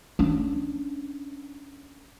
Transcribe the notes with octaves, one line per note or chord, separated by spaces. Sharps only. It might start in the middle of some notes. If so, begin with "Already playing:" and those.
C#4 D4